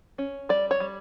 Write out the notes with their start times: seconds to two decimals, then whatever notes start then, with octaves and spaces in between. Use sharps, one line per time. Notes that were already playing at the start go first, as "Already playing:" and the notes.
0.18 C#4
0.49 G3 D5
0.71 C#5
0.80 G3